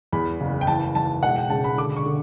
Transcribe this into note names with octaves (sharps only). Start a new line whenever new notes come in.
E2 B5
F#1
G5
E3 A5
E3 A5
E1 F#5
G5
C#3 A5
B5
D3 D6
C#6
D3